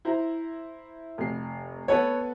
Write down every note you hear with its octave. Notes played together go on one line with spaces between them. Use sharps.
E4 C5 A#5
F1 C7
B3 A4 B4 C#5